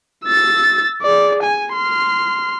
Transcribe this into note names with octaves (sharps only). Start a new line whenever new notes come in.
E6 A6
G#4 D5
G#5
C6 F6